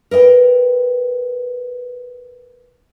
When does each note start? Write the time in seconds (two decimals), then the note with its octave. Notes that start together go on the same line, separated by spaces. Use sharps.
0.11 A#4 B4 D#5 G5